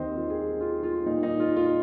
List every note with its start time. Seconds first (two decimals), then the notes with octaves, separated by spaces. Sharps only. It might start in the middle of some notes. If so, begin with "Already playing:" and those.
Already playing: D#2 D#3 A#3 C4 D#4 C5 D#5
0.16 F4
0.30 G#4
0.38 F4
0.60 F4
0.83 F4
1.06 A#2 A#3 D#4
1.23 D#4
1.40 F4
1.56 F4